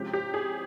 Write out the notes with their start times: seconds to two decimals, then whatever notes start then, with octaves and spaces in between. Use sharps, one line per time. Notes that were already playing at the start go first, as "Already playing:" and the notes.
Already playing: C3 F3 G#3 C#4 G4
0.13 G4
0.34 G#4